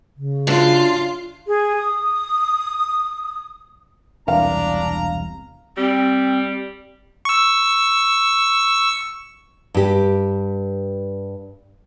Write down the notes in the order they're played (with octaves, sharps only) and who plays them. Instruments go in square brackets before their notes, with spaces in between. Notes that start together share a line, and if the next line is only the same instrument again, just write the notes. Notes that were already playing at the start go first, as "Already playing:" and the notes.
[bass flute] C#3
[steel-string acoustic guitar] F#2 D4 [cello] F4
[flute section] G#4
D#6
[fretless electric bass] E1 C2 [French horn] D4 [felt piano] F5 [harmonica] A#5
[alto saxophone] G3 [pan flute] C4
[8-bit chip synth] C#6 E6
[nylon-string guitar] G2 G4